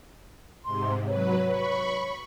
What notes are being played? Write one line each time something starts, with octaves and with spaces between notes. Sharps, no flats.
G#2 C3 C6
F#3 B4 C#5
B5 C#6